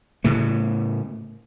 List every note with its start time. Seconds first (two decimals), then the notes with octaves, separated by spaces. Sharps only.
0.24 A2 C#3 A3